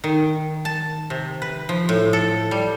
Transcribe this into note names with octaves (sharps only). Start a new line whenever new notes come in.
D#3
A5
C3
B4
F3
A2
A4
G3